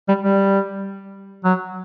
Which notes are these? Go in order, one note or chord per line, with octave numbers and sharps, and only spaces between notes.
G3
G3
F#3